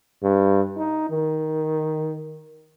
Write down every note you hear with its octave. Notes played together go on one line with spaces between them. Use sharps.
G2
D#4
D#3